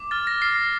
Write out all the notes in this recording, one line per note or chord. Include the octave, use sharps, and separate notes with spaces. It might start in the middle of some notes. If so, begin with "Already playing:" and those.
Already playing: D6
F6 A6
A#6
F6 C7